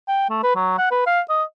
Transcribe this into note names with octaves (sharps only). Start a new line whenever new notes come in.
G5
A3
B4
F#3
F#5
B4
F5
D#5